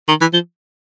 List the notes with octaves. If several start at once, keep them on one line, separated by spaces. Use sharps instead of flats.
D#3
E3
F3